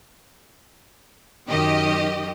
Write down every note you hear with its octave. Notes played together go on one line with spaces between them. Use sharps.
F#2 D#3 G4 D#5